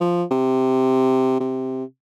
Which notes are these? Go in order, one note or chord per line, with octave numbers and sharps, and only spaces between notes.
F3
C3
C3